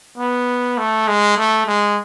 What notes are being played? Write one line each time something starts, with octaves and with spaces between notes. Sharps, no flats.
B3
A3
G#3
A3
G#3